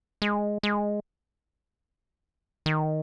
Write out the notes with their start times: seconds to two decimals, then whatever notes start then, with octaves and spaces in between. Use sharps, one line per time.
0.22 G#3
0.63 G#3
2.66 D#3